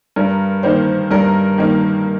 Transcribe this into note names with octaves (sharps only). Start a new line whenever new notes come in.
G2 A#4
D#3 A#3 C5
G2 A#4
D#3 A#3